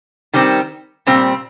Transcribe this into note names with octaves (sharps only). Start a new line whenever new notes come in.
D#3 G3 C4
A#2 G3 C4